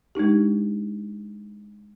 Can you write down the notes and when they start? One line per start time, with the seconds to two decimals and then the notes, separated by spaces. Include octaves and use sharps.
0.15 G#3 D4 D#4 G4